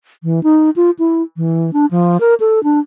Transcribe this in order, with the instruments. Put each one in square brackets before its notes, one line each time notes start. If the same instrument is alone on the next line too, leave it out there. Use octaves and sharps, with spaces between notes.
[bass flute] E3
D#4
F4
E4
E3
D4
F3
A#4
A4
D4